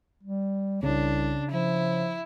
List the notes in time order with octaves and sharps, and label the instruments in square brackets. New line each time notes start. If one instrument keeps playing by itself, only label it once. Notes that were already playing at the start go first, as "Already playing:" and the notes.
[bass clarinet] G3
[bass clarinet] C2 [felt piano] C#3 [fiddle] D4
[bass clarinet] F3 [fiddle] E4